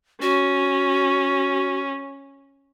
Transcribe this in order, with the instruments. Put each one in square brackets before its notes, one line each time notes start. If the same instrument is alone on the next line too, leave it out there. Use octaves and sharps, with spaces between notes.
[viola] C#4 [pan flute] F#4